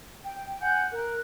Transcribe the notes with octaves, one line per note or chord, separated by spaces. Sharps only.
G5
F#5 G#5 G6
A#4 F#6